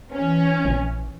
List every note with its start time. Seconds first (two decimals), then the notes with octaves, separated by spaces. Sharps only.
0.12 E3 C#4
0.65 A#1